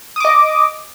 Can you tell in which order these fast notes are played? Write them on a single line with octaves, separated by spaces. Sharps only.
D#6 D6 D#5